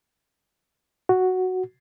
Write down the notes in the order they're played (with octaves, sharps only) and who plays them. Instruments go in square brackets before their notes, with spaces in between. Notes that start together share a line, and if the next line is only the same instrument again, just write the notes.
[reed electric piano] F#4